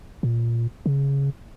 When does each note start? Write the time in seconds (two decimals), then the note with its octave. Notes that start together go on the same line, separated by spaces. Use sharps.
0.23 A#2
0.86 C#3